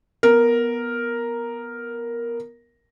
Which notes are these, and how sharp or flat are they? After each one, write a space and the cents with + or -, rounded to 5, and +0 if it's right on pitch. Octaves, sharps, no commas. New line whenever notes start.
B3 -10 A#4 +0